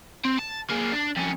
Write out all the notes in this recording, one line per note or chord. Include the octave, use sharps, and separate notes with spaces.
C4
A5
A#3 G#4
D4
F2 C#4